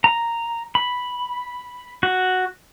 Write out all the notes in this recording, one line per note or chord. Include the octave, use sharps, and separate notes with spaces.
A#5
B5
F#4